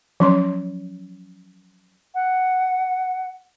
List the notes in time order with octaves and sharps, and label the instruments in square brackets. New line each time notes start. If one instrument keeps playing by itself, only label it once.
[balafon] F3 F#3 C#4 C#5 C6
[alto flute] F#5